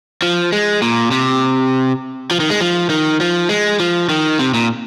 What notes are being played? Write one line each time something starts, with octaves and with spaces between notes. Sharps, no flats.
F3
G#3
A#2
C3
F3
D#3
G#3
F3
D#3
F3
G#3
F3
D#3
C3
A#2